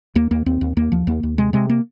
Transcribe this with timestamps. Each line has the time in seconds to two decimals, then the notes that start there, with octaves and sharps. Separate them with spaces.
0.15 D#2 A#3
0.31 D#2 A#3
0.46 D#2 C4
0.61 D#2
0.77 D#2 A#3
0.92 D#2 F3
1.07 D#2 A#3
1.23 D#2
1.38 C3 G#3
1.53 C3 G#3
1.69 A#3